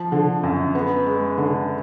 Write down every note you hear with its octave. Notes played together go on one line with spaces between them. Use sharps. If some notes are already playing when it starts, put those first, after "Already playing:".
Already playing: F3
D3
F#2
B3
G#3
D3